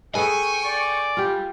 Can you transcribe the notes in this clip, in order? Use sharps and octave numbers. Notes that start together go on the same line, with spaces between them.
G#4 A4 B4 G5 G#5 C#6
D5
G3 F4 G4